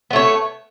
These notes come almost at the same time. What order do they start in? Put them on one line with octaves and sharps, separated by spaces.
B3 A3 C#5